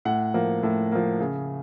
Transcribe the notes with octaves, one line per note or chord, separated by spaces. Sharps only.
A2 F#5
F3 A#3
A2
F3 A#3
C#3